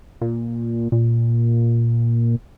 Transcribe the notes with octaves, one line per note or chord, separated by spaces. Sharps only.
A#2
A#2